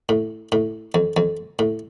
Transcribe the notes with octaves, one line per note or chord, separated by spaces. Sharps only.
A2
A2
F2
F2
A2